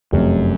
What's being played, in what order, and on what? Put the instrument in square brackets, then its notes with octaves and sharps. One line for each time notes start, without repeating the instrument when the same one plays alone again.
[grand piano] F1 [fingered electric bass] F#2